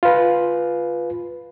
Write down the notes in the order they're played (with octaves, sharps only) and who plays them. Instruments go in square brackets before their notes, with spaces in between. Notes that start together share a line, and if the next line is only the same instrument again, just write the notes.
[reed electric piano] F4 B4